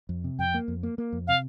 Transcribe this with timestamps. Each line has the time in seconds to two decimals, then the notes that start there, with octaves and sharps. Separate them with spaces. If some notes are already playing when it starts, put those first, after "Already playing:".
0.09 F2
0.24 C3
0.39 F2 G5
0.54 A#3
0.68 F2
0.83 A#3
0.98 A#3
1.12 F2
1.28 C3 F5